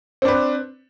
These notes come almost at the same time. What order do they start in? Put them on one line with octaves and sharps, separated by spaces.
C4 D4 B4